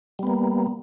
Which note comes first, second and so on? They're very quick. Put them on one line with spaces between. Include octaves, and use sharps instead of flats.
G3 B3 A#3